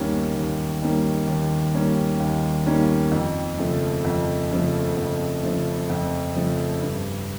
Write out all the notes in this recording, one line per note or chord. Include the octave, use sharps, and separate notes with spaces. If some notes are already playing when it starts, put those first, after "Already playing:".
Already playing: D#2 D#3 G3 A#3 C#4
D#2
D#3 G3 A#3 C#4
D#2
D#3 G3 A#3 C#4
D#2
D#3 G3 A#3 C#4
F2
C#3 F3 A3
F2
C#3 F3 A3
F2
C#3 F3 A3
F2
C#3 F3 A3
G2